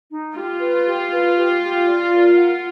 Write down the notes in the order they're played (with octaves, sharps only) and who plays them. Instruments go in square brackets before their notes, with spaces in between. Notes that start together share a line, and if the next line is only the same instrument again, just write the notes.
[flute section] D#4
[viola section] F4 [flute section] G4
[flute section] B4
G4
B4
G4
G4
D5
A#4
F#5